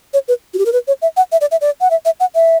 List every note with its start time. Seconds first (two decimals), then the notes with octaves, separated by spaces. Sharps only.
0.13 C#5
0.28 B4
0.54 F#4
0.58 G4
0.66 A#4
0.73 B4
0.88 C#5
1.02 E5
1.17 F#5
1.32 E5
1.41 D5
1.51 E5
1.61 D5
1.81 F#5
1.90 E5
2.05 E5
2.20 F#5
2.35 E5